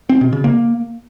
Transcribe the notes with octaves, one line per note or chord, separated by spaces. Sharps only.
C4
B2
C#3
A#3